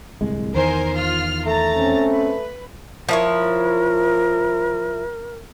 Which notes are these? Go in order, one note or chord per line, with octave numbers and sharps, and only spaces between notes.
D1 C2 G#3
E2 D#3 E3 A#4 C5 G#5
F4 F6
A3 A#5 A6
C4 C#4
B4
F3 E4 A#4 C#5